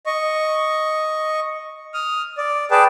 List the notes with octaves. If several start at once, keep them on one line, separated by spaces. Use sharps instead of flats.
D#5 C#6
D#6 F6
D5
G#4 B4 D5 G5 A5